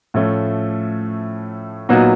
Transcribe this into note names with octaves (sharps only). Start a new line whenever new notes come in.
A2 F3 A3 C#4
A#2 F#3 B3 D#4 F#4